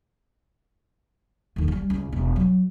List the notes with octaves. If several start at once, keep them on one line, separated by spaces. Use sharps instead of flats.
D#2 D3
F3 G3
C#2
E1
F#3